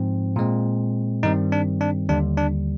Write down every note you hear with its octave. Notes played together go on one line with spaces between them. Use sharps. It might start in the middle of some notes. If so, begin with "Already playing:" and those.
Already playing: G#2 F3 C4
A#2 G#3 C4
G2 D#3 G3 C4 D#4
D4
D4
D#2 D3 G3 D4
D4